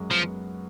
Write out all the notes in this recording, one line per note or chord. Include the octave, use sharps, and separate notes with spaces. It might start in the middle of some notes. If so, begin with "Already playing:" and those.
Already playing: F#2 G#3
F3 B3